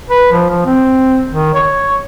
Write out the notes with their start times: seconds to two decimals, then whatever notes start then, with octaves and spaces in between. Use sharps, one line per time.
0.10 B4
0.32 F3
0.50 F3
0.66 C4
1.32 D#3
1.54 C#5